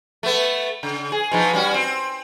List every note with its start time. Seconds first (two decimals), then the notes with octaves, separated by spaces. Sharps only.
0.23 A3 B3
0.83 C#3
1.12 G#4
1.31 B2 F3 D#4
1.53 G3 C#4 F#4
1.74 C4